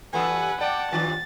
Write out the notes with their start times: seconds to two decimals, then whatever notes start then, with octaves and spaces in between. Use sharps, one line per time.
0.13 G2 E3 A4 B4 F#5 G#5
0.61 D5 F#5 G5 A5
0.92 G2 D#3 F3 A6